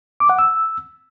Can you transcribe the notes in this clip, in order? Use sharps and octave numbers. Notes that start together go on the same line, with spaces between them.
D6
F#5
E6